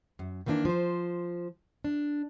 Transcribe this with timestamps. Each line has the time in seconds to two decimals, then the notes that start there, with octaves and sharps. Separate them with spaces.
0.19 F#2
0.46 D#3 E3 A#3 B3 D4
0.65 F3 C5
1.84 D4